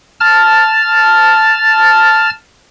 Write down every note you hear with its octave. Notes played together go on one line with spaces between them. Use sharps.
A5 F6 A6